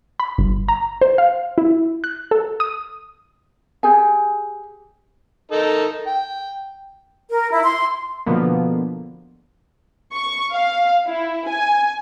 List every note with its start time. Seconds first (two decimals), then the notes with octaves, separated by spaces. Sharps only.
0.20 B5
0.38 G1
0.68 A#5
1.01 C5
1.18 F5
1.58 E4
2.04 F#6
2.31 A4
2.60 D#6
3.83 G4 G#4 G#5
5.52 D#4 A4 A#4
6.07 G5
7.30 A#4
7.51 E4
7.63 C6
8.26 B2 D3 F3 A#3 B3
10.14 C#6
10.52 F5
11.07 E4
11.48 G#5